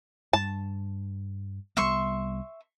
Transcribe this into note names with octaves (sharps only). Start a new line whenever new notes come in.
G2 A5
C2 G3 B3 E5 C6 C#6